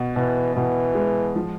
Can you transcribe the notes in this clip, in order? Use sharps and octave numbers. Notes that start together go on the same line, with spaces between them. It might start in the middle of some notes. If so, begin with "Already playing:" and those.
Already playing: B2
B2 E3
B2 E3
G#3
F3